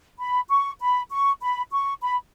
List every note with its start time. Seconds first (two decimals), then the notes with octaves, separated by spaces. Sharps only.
0.19 B5
0.50 C#6
0.80 B5
1.11 C#6
1.41 B5
1.72 C#6
2.02 B5